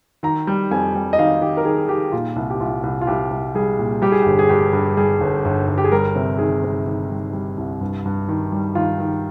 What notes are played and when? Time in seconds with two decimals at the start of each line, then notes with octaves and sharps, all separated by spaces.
0.23 D#3 A#5
0.47 G3
0.71 F2 G#5
0.95 G3
1.13 D#5
1.19 D#3 F5
1.41 D#3 G4
1.57 A#4
1.65 D#3 G#4
1.89 D#3 G4
2.12 A#2 F4
2.36 C2
2.50 G4
2.60 C2 F4
2.83 C2
3.01 F4
3.07 C2 G4
3.31 C2
3.55 G3 G#4
3.79 A#2
4.02 G3 G4
4.12 G#4
4.22 G1 G4
4.39 G#4
4.49 G2 G4
4.73 G2
4.97 G3 G#4
5.21 G1
5.45 G1
5.68 G1
5.78 G4
5.84 G#4
5.92 G3 A#4
6.16 C3
6.39 D#3 G#4
6.63 C3
6.86 D#3
7.10 G3
7.33 G3
7.58 C2
7.81 G2
8.05 G2
8.28 D#3
8.52 G3
8.75 D#3 F4
9.00 D#3